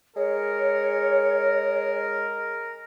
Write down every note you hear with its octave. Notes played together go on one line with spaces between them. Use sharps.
G#3 A#4 C#5